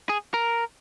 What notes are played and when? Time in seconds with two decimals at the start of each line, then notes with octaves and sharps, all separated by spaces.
0.09 G#4
0.34 A#4